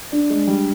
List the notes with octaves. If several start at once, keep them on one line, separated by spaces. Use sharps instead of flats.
D4
G#3
G3